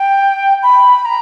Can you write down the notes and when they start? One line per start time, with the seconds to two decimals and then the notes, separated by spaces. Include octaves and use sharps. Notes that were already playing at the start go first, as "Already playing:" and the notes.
Already playing: G5
0.63 B5
1.05 A#5